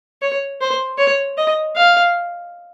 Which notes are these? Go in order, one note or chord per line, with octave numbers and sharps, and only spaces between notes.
C#5
C5
C#5
D#5
F5